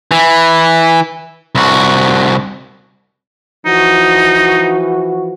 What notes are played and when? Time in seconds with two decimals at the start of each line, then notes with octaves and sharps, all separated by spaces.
0.11 E3
1.55 C2 F#4
3.66 E3 F3 D#4 F#4